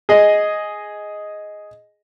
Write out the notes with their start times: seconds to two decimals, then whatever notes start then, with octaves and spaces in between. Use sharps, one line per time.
0.09 G#4 D#5